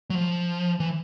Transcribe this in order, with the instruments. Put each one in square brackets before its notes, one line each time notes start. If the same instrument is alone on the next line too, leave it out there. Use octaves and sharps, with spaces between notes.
[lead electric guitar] F#3
F3
E3